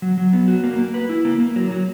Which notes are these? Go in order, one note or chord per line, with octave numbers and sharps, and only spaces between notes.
F#3
F#3
B3
F#4
A#3
A#3
B4
E4
A#3
A#3
F#3
F#3